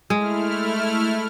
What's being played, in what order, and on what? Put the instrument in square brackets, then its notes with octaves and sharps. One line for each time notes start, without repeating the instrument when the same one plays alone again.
[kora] G#3 [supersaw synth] A3 E4 F6